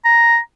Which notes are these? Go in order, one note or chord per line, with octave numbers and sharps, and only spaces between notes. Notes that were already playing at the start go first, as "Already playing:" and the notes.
A#5